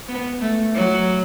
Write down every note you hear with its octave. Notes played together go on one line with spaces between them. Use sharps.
B3
A3
F#3